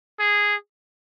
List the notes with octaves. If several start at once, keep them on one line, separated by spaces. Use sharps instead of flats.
G#4